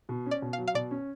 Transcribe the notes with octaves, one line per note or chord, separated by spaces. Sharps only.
B2
C#4
D5
B2
F#3 F5
F5
B2 D5
C#4